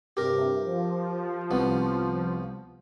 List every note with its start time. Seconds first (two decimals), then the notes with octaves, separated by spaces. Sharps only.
0.17 G2 C3 G4 A#4
0.63 F3
1.51 C2 B3